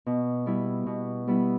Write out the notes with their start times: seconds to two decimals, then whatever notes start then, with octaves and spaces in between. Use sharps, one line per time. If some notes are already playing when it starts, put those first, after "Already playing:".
0.06 B2
0.46 G3 B3 E4
0.86 B2
1.27 G3 B3 E4